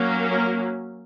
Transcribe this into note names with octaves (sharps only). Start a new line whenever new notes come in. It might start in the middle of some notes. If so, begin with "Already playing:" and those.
Already playing: F#3 A#3 C#4
A#4